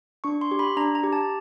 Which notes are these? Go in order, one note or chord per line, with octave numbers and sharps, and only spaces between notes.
D4 C#6
C6
G4
B5
D4 A#5
A#5
G4
A5